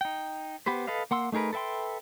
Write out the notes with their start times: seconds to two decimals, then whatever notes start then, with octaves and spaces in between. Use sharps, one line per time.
0.01 D#4 G5
0.66 B3 G4 B4 C5
0.87 A4 B4 D#5 F5
1.11 A#3 F#5 C6 E6
1.32 A3 D#4 G#4 A#4 B4
1.53 A4 B4 E5 G5 C6